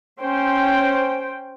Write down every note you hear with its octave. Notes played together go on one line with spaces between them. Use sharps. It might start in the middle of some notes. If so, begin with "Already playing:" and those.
C#4 C5 G5